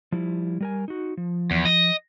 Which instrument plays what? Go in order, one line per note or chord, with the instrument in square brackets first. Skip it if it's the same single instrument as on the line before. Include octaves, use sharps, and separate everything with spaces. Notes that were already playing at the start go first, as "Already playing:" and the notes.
[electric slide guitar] F3 G3 E4
G3 A#4 G#5
D#4 F#4
F3
[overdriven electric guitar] E2
D#5